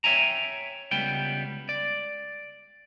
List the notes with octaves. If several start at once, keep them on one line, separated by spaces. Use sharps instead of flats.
C#5 E5 G5 G#5 A#5
C#2 G3 B3 G5
D5